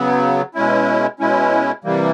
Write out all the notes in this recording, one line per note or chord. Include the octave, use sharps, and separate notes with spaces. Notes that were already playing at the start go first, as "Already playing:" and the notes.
Already playing: C#3 F#3 B3
B2 G#3 C#4 E4
B2 G#3 C#4 E4
C3 E3 G3 A#3